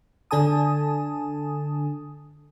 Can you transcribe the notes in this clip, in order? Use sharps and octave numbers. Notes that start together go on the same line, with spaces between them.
D3 D4 A4 G#5 A5 D#6